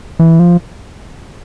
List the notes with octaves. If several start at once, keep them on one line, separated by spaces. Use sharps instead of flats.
E3
F3